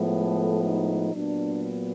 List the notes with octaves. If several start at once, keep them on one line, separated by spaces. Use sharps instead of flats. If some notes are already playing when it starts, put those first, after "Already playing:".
Already playing: A2 F3 G#3 B3
A4
D#4
A#2 F#3 B3 D4